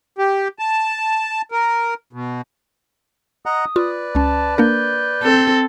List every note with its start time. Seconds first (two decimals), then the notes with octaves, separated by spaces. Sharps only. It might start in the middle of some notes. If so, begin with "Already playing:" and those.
0.18 G4
0.59 A5
1.52 A#4
2.13 B2
3.46 D#5 F#5 A#5 D#6
3.76 F4 B4 D5
4.15 C#2 C#4 A5
4.58 A#3 D4 A#4 G6
5.23 C4 A4